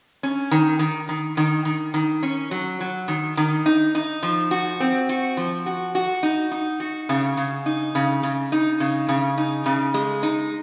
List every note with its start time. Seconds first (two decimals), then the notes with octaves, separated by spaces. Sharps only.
0.23 C#4
0.51 D#3
0.79 D#3
1.09 D#3
1.37 D#3
1.65 D#3
1.94 D#3
2.23 C#4
2.51 F#3
2.81 F#3
3.08 D#3
3.37 D#3
3.66 D#4
3.95 D#4
4.23 F3
4.51 F#4
4.80 C4
5.09 F#4
5.37 F3
5.66 F#4
5.95 F#4
6.23 D#4
6.51 D#4
6.80 F#4
7.09 C#3
7.37 C#3
7.66 D#4
7.95 C#3
8.23 C#3
8.52 D#4
8.80 C#3
9.08 C#3
9.38 D#4
9.66 C#3
9.94 G#3
10.23 D#4